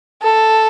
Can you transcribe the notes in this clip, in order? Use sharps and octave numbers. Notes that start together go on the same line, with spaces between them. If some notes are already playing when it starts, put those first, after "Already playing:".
A4